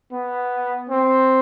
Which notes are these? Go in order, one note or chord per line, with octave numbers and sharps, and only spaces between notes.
B3
C4